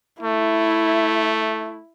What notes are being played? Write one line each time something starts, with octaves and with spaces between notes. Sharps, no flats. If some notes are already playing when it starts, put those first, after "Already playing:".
A3 E4